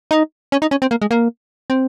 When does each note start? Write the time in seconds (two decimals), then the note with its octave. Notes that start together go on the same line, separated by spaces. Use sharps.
0.11 D#4
0.52 C#4
0.62 D#4
0.71 C#4
0.82 C4
0.91 A#3
1.02 G#3
1.11 A#3
1.70 C4